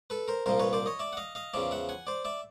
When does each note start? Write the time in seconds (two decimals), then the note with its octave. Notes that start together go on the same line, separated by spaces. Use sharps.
0.10 A4 B4
0.28 A#4 C5
0.46 C2 A#2 F3 A#4 C5
0.60 B4 C#5
0.73 C5 D5
0.86 C#5 D#5
0.99 D5 E5
1.13 F#5
1.17 D#5 F5
1.35 D#5 F5
1.54 E2 C#3 F3 D5 E5
1.71 E5 F#5
1.89 F#5 G#5
2.07 C5 D5
2.25 D5 E5